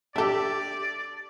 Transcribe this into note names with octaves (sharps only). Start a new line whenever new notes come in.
D4 G4 A4 D5 E5